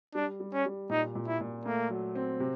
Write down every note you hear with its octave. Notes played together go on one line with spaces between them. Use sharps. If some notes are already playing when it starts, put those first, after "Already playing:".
G3 D4
G3
C#4
G3
A#2 D#4
A#2
E4
A#2
A3 A#3
F#3
C4
C3